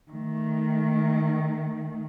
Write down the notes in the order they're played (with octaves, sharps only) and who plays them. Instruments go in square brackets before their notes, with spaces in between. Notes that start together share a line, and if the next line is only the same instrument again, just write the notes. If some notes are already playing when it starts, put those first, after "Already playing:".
[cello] D#3 A3